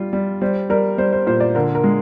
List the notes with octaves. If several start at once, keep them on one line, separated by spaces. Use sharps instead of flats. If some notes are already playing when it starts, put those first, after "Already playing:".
Already playing: G3 F4
G3
G3 C5
G3 A#4
G3 C5
C5
A#2 C5
D5
D3 A#4
A#4
G#3